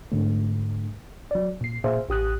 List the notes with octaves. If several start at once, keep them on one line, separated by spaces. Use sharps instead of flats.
G#2 D3 A3
F#3 D5
A#2 C7
A#2 G#4 C5 E5 F5
A1 G4 D#6 F#6